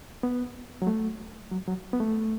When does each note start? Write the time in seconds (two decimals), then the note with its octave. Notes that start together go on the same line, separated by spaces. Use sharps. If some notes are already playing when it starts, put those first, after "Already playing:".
0.23 B3
0.82 F#3
0.87 A3
1.52 F#3
1.68 F#3
1.93 B3
2.00 A3